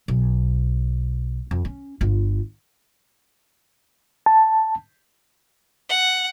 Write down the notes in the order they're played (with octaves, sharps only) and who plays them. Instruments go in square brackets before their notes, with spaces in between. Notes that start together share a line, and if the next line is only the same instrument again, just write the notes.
[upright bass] B1
F2
C#4
G1 F4
[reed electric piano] A5
[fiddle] F#5